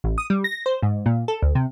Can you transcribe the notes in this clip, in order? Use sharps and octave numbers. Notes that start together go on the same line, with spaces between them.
A1
D#6
G3
A#6
C5
G#2
A#2
A4
D2
C3